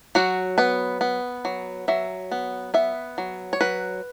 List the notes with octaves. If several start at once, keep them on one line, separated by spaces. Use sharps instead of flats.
F#3 F#4
B3 B4
B3
F#3
F#3 E5
B3
B3 E5
F#3
C#5
F#3 B4